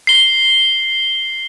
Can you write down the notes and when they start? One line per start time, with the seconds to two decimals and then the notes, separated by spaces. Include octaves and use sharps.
0.07 C7 G7